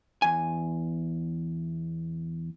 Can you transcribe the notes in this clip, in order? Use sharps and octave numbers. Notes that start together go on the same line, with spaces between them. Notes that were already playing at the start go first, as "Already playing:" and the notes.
E2 G#5